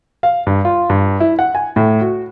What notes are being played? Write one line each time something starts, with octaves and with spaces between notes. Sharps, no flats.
F5
G2
F4
G2
E4
F#5
G#5
A2
F#4